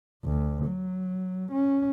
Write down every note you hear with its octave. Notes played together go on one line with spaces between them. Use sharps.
D2
F#3
C#4